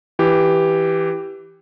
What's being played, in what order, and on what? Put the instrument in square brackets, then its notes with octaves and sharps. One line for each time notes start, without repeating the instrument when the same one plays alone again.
[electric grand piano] E3 G4